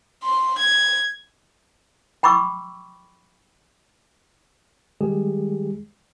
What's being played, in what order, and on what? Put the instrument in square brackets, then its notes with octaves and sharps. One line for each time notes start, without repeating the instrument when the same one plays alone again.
[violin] C6
G#6
[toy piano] G5 B5 C#6 D6 E6
[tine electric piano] D#3 G3 G#3 G4 G#4